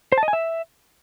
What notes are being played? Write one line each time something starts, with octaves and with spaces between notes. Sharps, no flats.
C5
A5
D#5
G#5
E5